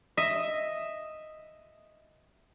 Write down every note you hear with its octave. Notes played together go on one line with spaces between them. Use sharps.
D#5 E5